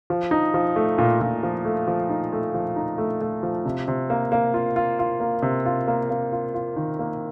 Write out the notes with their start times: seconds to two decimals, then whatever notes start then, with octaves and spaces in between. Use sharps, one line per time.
0.10 F3
0.31 D#4
0.54 F3
0.76 A3
0.98 A#2
1.21 A#2
1.43 F3
1.65 A3
1.87 F3
2.10 D#4
2.32 A3
2.54 F3
2.76 D#4
2.98 A3
3.21 A3
3.43 F3
3.65 C3
3.88 C3
4.10 A#3
4.32 A#3
4.54 F4
4.76 F4
4.99 F4
5.20 A#3
5.42 C3
5.66 F4
5.88 A#3
6.10 A#3
6.32 F4
6.54 F4
6.76 D#3
6.99 A#3